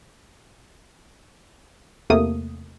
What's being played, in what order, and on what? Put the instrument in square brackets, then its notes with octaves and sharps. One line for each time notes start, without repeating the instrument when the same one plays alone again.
[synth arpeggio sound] E2 C3 A3 A#3 D#6